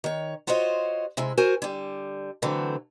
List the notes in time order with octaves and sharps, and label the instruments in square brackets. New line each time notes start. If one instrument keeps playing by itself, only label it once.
[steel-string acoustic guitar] D#3 C#5
F4 F#4 C5 C#5 D#5
C3 G#3 E4
F#4 A#4 C5 G#5
D3 G3
D3 E3 F#3 A3 C4